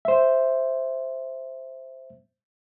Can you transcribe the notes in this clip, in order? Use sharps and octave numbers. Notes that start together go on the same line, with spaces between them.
C5 E5